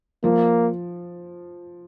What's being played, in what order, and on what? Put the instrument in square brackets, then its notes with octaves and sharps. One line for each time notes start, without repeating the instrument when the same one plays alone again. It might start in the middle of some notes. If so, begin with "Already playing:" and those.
[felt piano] F3 [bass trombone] A#3